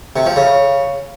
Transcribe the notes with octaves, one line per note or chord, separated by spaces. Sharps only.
C3
F3
C#3